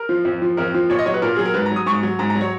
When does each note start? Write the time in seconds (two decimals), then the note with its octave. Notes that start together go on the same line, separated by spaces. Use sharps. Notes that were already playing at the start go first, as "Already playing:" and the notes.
Already playing: A#4
0.09 F3
0.25 F2
0.42 F3
0.57 F2 A#4
0.74 F3
0.90 A#2 C#5
0.99 D#5
1.06 F#3 C#5
1.14 B4
1.22 A#2 A#4
1.36 F#3 G#4
1.46 A#4
1.54 G#2 B4
1.66 A#5
1.71 F#3 D#6
1.86 G#2 C#6
2.03 F#3
2.19 G#2 A#5
2.30 A#5
2.35 F#3
2.41 C#5